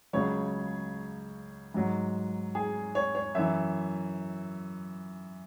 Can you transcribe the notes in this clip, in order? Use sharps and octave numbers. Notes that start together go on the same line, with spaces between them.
C#2 C#3 F#3 C#5
G#2 F#3
G#4
C#5
C#5
F#2 E3 E5